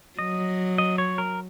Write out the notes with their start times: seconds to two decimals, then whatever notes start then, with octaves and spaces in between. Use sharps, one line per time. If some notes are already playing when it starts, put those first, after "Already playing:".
0.19 F#3 D#5
0.78 D#5
0.98 C#5
1.18 A#4